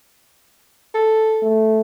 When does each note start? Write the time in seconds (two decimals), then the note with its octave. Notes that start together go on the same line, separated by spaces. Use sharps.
0.95 A4
1.43 A3